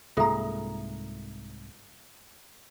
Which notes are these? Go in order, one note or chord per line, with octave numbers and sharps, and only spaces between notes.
C2 G#2 A#3 F4 G#4 A4 E5 A#5